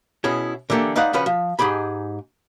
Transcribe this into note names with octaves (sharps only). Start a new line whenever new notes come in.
B2 B3 C#4 E4 G#4
D3 E3 A#3 G4 A4
G#3 D#4 B4 D5 F5 F#5
C#3 F3 C#4 F#4 B4
F3
G#2 D#4 G4 G#4 B5